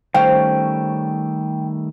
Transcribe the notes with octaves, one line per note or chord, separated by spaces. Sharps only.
D#3 G3 A3 C#4 C5 F5 G5